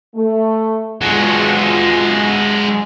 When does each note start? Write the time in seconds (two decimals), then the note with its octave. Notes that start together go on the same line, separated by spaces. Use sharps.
0.15 A3
1.01 G#3 B3 F4 F#4 G#4